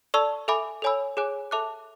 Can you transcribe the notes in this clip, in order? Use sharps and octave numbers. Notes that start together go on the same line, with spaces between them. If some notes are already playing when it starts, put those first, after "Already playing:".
A4 D5 A5 C#6 E6
A4 E5 G#5 B5 D6
A4 C#5 G#5 B5 E6
G#4 C#5 G#5 D6 F#6
A4 E5 A5 D6 F#6